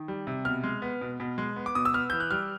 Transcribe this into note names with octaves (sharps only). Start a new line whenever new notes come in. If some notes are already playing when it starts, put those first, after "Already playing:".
Already playing: D#3
G3
C3
B2 F6
G#3
B3
B2
B2
G#3
B3
D6
B2 D#6
E6
B3 F6
E3 G6
F#6
G3 F6